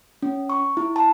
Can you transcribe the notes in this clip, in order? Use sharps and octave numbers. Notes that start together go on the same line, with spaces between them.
C#4
C#6
E4
A5